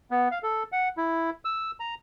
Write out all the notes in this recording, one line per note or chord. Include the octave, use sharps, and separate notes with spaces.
B3
F5
A4
F#5
E4
E6
A#5